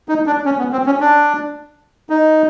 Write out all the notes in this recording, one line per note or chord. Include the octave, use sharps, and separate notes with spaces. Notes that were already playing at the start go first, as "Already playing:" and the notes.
D#4
D4
C#4
B3
C4
C#4
D4
D#4